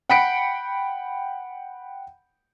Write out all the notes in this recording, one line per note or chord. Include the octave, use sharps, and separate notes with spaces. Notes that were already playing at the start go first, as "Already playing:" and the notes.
F#5 G5 B5 B6 C#7 D7